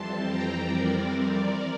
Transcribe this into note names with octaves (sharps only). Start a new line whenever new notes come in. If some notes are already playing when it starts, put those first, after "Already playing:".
Already playing: F2 E3 G3 C4 A5 C6
G5 A#5
A#4 D5